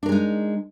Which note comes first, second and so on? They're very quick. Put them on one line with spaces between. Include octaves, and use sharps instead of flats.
D4 A#4 G#3 D#4